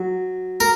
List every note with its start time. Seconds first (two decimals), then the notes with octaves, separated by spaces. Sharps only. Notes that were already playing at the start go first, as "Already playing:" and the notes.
Already playing: F#3
0.60 A#4